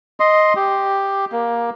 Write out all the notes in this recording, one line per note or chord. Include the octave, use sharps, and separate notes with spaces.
D#5 C6
G4
A#3